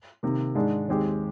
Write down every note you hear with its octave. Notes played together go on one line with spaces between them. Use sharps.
C3 D#3 A#3
G#2 D#3 G#3 D4
D#2 D#3 G#3 C4 G4